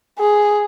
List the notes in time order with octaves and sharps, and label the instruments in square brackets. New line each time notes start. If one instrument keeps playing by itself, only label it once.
[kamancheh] G#4